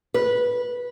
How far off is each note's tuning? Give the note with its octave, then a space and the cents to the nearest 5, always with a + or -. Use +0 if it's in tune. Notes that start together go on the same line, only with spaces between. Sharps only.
B4 -15